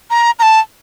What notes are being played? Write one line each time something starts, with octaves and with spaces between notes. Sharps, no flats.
A#5
A#5
A5